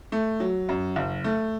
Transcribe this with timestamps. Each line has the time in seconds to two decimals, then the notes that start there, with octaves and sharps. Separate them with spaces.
0.12 A3
0.40 F#3
0.69 F#2
0.96 F#1
1.24 A3